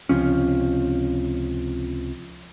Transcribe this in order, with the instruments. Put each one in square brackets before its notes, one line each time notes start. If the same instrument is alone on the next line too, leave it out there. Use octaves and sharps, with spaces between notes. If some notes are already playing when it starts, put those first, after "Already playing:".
[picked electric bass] C#2 C3 F3 C#4